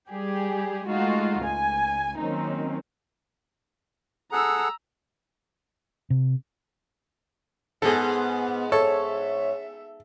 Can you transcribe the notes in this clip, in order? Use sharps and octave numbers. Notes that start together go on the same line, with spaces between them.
G3 G4 G#4
G#3 A3 D#4 F4 F#4
C#2 G#5
D#3 F#3 A#3 C4 C#4 D#4
G#4 A4 F#5 A#5 E6
C3
G#2 B3 G#4 A4
A4 C#5 E5